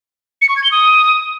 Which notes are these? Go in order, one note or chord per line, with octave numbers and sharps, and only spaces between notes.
C#7
C#6
G#6
G7
D#6